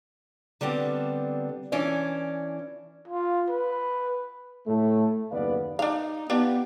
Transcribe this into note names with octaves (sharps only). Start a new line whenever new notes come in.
D3 G3 B3 C4 D4
E3 C#4 D4 D5
F4
B4
A2 A3
F#1 D#2 B3 B4 D5 F5
D4 D#4 F5
B3 D4 F4 G4 B4